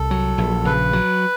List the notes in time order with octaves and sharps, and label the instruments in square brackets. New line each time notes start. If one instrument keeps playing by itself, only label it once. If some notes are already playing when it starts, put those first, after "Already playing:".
Already playing: [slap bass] C2 [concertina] A4
[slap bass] F#3
A#1
[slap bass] C#3 [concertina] B4
[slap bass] F#3